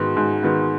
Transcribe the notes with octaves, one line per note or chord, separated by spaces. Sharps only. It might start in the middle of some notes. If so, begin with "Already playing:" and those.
Already playing: G#2 D#3 G#3 B3 F#4
G#2
D#3 G#3 B3